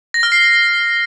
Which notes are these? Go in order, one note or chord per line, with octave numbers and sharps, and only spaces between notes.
A#6
F6
C7